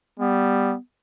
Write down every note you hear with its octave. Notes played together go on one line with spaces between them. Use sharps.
G3 B3